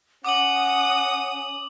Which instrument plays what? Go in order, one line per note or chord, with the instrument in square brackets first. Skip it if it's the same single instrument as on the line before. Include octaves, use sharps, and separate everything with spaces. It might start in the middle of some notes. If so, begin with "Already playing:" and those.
[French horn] C#4 [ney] F#5 [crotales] D6 F#7 [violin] D#6